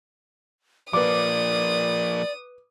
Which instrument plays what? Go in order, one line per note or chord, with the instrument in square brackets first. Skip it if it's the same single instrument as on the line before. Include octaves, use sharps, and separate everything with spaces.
[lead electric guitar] F3 A#3 [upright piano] B4 D6 [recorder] D5 [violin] D#6